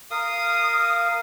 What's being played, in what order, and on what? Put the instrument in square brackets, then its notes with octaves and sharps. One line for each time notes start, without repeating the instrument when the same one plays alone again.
[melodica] A#4 F5 [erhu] D#6